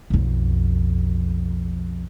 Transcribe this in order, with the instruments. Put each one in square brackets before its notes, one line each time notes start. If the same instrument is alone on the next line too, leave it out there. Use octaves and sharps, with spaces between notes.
[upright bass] B1 F2